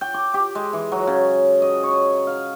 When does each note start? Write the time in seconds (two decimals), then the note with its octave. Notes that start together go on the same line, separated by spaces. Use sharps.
0.01 G5
0.14 D6
0.34 G4
0.55 G#3
0.73 E3
0.92 F#3
1.07 C#3
1.62 D#5
1.83 C#5
2.27 F5